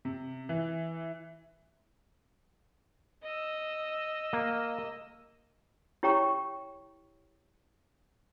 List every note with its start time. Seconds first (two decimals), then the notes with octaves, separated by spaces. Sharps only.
0.05 C3
0.49 E3
3.23 D#5 E6
4.33 A#3
6.03 E4 G4 C#5 G5 A#5 C#6